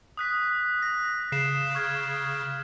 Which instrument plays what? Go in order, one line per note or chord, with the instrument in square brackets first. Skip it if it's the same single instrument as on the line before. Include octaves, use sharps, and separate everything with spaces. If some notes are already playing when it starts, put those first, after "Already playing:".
[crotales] D#6 F#6 B6
[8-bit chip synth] A#6
[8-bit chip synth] C#3 [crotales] C7 E7
[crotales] C#6 F6 G#6